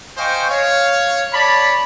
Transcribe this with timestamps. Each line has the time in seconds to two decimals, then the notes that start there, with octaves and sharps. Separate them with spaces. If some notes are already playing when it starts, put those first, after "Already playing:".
0.18 C5 D#5 F5 G5 G#5 C#6
0.50 C#5 F5
1.33 C#5 D5 A5 B5